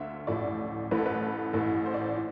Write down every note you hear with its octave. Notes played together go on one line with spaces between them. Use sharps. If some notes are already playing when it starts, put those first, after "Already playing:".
Already playing: D2 D3 E5 F5
A1 A2 F3 D5
A1 A2 E3 B4
A4
B4
A1 A2 E3
C5
D5
C5
E3